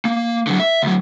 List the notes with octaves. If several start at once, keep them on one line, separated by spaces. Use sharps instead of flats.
A#3
D3 F#3
E5
D2 F#3